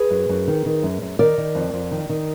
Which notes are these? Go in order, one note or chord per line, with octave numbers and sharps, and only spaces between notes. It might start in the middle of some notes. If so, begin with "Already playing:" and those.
Already playing: G#4 B4
F#2
F#2
D#3
D#3
F#2
F#2
D#3 A#4 D5
D#3
F2
F2
D#3
D#3